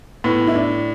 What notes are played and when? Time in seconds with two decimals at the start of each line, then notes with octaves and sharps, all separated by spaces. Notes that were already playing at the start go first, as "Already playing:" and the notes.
0.24 A2 B3
0.47 E4
0.55 D4